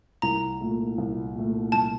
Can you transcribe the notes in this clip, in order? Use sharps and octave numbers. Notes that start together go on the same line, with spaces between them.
C2 A#5
A#2 A3
C2
A#2 A3
C2 A5